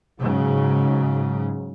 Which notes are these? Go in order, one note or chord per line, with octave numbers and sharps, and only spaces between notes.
G#2 C#3 F#3